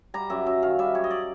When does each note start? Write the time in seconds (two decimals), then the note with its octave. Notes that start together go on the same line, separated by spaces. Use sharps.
0.14 G3 A#5
0.30 F#2 E5
0.46 F#2 E5
0.62 D#3 F5
0.79 G3 E5
0.95 F#2 C#5
1.04 D#5
1.11 D5